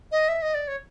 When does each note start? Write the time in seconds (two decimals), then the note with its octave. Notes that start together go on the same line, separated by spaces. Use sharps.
0.12 D#5
0.29 E5
0.42 D#5
0.54 D5
0.68 C#5